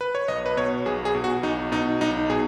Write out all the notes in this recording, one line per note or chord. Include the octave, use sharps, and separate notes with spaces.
B4
C#5
B1 D#5
B4
B2 C#5
B1 G#4
G#4
B2
F#4
B1 D#4
B2 D#4
B1 D#4
B2 G#4